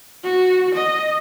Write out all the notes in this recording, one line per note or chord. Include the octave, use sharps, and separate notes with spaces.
F#4
D#5